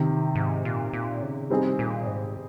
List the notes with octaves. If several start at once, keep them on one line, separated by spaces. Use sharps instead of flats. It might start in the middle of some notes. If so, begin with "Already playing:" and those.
Already playing: C3 D#3
G#2
A#2
A#2
C#3
C3 G3 C4 D#4 G#4
A#2
G#2